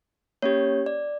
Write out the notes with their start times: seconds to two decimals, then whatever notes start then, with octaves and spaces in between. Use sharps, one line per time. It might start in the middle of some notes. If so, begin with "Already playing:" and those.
0.42 A#3 C#4 G4 C#5
0.86 D5